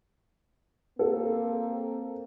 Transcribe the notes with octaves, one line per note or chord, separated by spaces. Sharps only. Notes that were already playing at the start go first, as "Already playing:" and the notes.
A#3 C4 A4